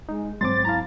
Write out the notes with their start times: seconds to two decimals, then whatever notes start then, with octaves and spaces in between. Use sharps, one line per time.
0.09 G#3 D#4
0.41 G#2 F#3 G#3 C4 C6 D6 A6
0.65 E4 F5 A5 A#5